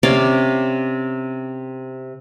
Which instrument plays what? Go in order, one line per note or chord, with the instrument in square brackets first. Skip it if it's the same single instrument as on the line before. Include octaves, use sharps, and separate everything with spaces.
[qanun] C3 C#4 D5 F5